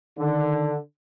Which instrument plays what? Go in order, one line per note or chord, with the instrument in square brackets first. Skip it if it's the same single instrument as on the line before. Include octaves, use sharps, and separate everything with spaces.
[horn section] D3 [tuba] D#3